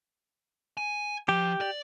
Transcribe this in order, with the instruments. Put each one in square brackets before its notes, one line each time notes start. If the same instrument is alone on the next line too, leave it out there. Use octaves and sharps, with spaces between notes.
[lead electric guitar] G#5
[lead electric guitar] F3 [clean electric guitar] G4
[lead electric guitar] D5